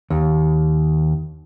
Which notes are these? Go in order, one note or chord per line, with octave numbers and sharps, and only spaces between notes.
D#2